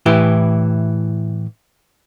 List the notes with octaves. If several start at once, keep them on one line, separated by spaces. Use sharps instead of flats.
A2 E3 E4 G4